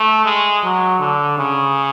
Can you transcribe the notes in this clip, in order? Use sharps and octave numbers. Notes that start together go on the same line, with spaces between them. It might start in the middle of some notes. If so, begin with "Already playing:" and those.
Already playing: A3
G#3
F#3
D3
C#3